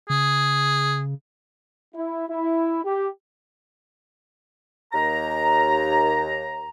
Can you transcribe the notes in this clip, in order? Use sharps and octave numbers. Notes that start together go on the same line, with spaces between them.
C#3 G#4
E4
E4
G4
D#2 A#5